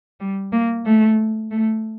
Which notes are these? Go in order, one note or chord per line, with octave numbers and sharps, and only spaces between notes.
G3
A#3
A3
A3